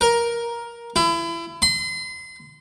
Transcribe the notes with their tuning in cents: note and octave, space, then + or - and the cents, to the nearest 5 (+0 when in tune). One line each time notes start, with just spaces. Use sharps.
A#4 +10
E4 +30
C6 -30